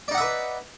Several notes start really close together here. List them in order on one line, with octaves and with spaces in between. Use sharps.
D5 D#4 F#5 E5 B4